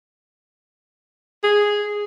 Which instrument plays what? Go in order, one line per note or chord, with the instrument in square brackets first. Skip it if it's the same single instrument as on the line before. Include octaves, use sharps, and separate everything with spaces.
[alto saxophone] G#4